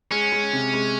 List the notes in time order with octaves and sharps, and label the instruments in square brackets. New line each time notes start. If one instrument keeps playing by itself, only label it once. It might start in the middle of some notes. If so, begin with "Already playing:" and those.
[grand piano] G#3 [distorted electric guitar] C#4
[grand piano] G#3
C3
G#3